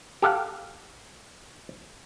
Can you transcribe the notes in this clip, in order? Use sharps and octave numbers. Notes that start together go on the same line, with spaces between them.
G4 A4 F5 F#5